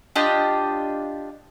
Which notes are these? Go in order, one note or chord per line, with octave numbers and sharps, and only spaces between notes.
D4 F4 G4 D#5